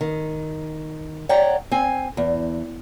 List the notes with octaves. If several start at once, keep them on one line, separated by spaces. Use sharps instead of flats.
D#3
C#5 D5 F#5 G5 A#5
C4 G#5
E2